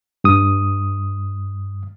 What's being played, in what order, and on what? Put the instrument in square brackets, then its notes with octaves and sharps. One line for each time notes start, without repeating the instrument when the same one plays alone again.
[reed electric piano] G2 D#6